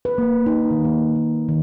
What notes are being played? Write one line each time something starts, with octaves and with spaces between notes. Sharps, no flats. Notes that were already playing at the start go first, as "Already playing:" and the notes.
B4
A#3
D#4
D#3
A#3
A#3
D#3